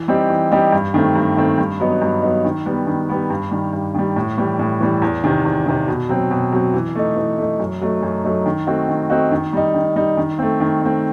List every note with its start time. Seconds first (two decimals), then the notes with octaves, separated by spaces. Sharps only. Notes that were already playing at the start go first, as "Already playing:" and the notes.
Already playing: E3
0.08 G3 C4 D#4 G4
0.30 E3
0.51 G3 C4 D#4 G4
0.72 G2
0.94 D#3 A3 C4
1.16 G2
1.37 D#3 A3 C4
1.58 G2
1.80 F#3 B3 D#4
2.02 G2
2.22 F#3 B3 D#4
2.45 D#3
2.66 G3 B3
2.87 D#3
3.09 G3 B3
3.30 G2
3.51 D#3 G3
3.73 G2
3.94 D#3 G3
4.16 A2
4.37 E3 G3
4.59 A2
4.81 E3 G3
5.02 E2
5.24 C3 D#3
5.45 E2
5.66 C3 D#3
5.88 B2
6.09 F#3 C4
6.31 B2
6.53 F#3 C4
6.74 E3
6.95 A3 D#4
7.16 E3
7.38 A3 D#4
7.60 F#2
7.81 F#3 A3 D#4
8.03 F#2
8.24 F#3 A3 D#4
8.46 D#3
8.67 A3 C4 D#4 F#4
8.89 D#3
9.10 A3 C4 D#4 F#4
9.31 D#3
9.53 G3 D#4
9.74 D#3
9.96 G3 D#4
10.17 D#3
10.39 A3 C4
10.60 D#3
10.82 A3 C4